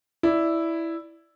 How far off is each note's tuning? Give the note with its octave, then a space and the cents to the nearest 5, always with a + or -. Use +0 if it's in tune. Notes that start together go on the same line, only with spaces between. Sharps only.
E4 +0 D5 +0